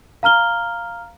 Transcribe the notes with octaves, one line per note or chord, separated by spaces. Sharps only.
F5 A#5 F6 G7